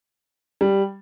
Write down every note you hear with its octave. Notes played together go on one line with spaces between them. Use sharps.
G3